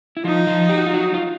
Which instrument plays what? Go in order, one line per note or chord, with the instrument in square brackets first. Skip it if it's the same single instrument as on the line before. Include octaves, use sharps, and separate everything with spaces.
[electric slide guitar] E4
[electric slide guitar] F3 F4 [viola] D#4
[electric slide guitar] F3 F4
G4
F#4
F4
F#3 F#4
F4